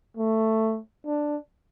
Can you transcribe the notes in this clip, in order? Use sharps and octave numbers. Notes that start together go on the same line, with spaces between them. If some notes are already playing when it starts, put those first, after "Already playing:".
A3
D4